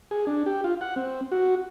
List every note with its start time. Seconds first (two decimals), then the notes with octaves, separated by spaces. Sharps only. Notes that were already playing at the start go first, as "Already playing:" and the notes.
0.11 G#4
0.27 D4
0.46 G4
0.64 F4
0.81 F#5
0.96 C4
1.32 F#4